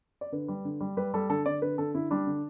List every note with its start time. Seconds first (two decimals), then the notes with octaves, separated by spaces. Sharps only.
0.21 D5
0.32 D3 B4
0.48 G3
0.65 D3
0.81 G3
0.97 G3 B4
1.14 G3 A4
1.29 D3 A4
1.46 D3 D5
1.62 D3 B4
1.78 D3 A4
1.95 D3 E4
2.11 G3 D4
2.27 D3